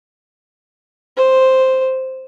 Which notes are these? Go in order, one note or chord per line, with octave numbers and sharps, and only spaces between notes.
C5